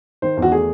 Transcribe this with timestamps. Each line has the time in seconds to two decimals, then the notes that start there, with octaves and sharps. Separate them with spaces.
0.22 D#3 C5
0.37 E2
0.42 F#4
0.52 A3 G#4